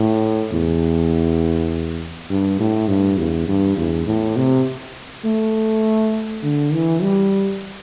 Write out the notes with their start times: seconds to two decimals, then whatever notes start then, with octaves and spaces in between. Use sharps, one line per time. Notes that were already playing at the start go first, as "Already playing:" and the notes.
Already playing: A2
0.52 E2
2.30 G2
2.60 A2
2.88 G2
3.18 E2
3.48 G2
3.77 E2
4.06 A2
4.37 C3
5.25 A3
6.43 D3
6.73 E3
7.02 G3